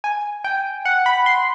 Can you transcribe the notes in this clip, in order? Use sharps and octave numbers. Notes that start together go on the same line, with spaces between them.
G#5
G5
F#5
B5
C6